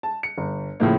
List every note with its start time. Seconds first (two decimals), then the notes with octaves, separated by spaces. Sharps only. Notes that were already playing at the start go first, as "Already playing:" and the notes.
0.03 A5
0.23 C#7
0.38 G1
0.80 A2 C#3 F3 A3 A#3